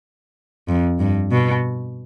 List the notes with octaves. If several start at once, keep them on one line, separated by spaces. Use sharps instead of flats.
F2
G2
B2